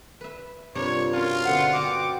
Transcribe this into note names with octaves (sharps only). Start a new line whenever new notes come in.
B4 E5
G2 C3 F4 A#4 C#5 D5
C#4 F4 F#4 A#4 C5
B2 D3 C4 B4 F#5
F#4 G4 A4 C5 D#5 D6